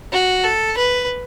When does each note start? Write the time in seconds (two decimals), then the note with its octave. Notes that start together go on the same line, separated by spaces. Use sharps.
0.12 F#4
0.44 A4
0.77 B4